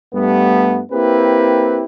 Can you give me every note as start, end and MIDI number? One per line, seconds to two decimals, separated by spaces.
0.14 0.80 43
0.14 0.80 55
0.14 0.80 57
0.14 0.80 59
0.92 1.84 58
0.92 1.84 60
0.92 1.84 64
0.92 1.84 67
0.92 1.84 71